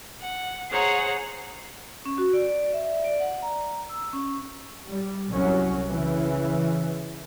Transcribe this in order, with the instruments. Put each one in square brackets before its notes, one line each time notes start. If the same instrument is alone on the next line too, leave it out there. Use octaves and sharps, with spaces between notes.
[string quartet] F#5
G#4 C5 C#5 F#5 A#5
[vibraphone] C#4
F#4
D5
D5
E5
D5
F#5
A#5
E6
C#4
[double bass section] G3
C2 F#3 C#4
C#3 E3